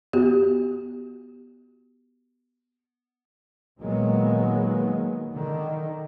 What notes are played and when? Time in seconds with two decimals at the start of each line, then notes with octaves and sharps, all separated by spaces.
0.13 B3 F#4 G4
3.80 A#2 D#3 F#3 G#3 A#3 B3
5.30 D3 D#3